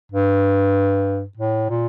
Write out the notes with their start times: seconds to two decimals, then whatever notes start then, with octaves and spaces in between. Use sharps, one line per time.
0.12 G2
1.37 A2
1.70 A#2